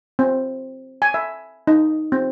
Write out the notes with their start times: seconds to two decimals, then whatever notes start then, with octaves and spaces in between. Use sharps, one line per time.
0.19 C4
1.02 G#5
1.14 E5
1.67 D#4
2.12 C4